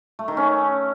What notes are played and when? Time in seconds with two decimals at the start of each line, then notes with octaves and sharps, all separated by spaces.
0.19 A3
0.28 D#3
0.37 C#4